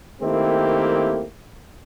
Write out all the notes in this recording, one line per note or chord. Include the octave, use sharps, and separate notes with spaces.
D#3 A3 A#3 C4 E4 G4